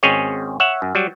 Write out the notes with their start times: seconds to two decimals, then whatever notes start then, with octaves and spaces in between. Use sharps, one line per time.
0.03 G#1 C4 C#4 G#4 C#5 D#5
0.60 C#5 E5 F#5
0.82 F#2
0.95 F#3 G3